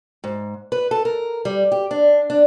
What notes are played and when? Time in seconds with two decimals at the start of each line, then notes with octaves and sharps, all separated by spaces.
0.24 G#2
0.72 B4
0.91 A4
1.05 A#4
1.45 G3
1.72 G4
1.91 D4
2.30 D4